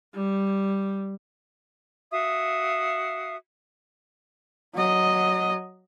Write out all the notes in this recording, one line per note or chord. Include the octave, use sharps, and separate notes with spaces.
G3
F#4 E5 F5 D#6
F#3 D#5